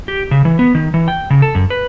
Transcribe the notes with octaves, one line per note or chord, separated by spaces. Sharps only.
G4
C#3
E3
B3
D#3
E3
G5
C#3
A4
F#2
B4